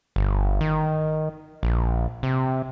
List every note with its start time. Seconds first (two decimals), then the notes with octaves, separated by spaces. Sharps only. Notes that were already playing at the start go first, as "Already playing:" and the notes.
0.16 G1
0.61 D#3
1.63 A#1
2.23 C3